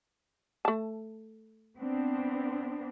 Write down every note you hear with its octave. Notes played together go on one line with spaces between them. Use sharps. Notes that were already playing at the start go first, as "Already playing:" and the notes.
A3 A5
B3 C4 D4